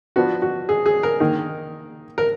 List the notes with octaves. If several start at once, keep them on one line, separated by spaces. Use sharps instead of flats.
F3 B3 D4 F#4
F#4
G#4
G#4
A#4
D#3 A#3 D#4
A#4